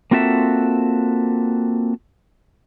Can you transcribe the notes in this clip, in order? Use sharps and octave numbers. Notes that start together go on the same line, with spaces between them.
A#3 C4 F4 F#4 A4 E5